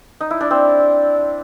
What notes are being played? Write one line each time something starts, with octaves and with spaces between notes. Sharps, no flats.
D#4
E4
D4
C4